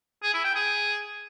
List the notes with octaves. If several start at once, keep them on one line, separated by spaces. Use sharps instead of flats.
G#4
E4
G5
G#4